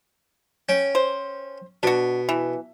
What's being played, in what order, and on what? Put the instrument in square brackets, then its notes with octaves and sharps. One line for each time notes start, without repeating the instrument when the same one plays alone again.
[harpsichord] C#4 G5
[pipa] C5
[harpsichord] B2 [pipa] D4 F#4
[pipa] E3